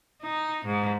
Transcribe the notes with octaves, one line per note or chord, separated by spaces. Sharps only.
D#4
G#2